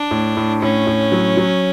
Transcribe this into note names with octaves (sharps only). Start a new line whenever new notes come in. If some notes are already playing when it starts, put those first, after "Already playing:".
Already playing: D4
A2
A2
A2 C#4
A2
F#3
F#3